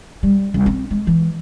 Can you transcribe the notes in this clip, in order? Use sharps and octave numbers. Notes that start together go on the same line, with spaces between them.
G3
C2
C4
G#3
E3